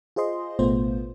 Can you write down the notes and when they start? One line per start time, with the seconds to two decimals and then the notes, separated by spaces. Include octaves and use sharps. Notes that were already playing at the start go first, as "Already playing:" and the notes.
0.16 F4 G#4 C5 D#5 C6
0.59 A1 B2 A3 B3 F4 C5